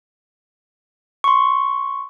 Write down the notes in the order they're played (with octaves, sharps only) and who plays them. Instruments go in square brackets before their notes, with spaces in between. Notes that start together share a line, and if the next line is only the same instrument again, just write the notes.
[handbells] C6 C#6